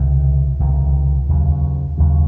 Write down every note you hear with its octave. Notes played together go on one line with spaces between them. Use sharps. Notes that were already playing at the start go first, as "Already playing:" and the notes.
Already playing: C#2 C3 D#3
C#2 C3 D#3
D#2 C#3 F#3
D#2 C#3 F#3